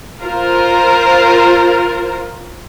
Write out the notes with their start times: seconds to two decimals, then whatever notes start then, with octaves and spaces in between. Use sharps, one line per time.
0.22 F4 A#4 C5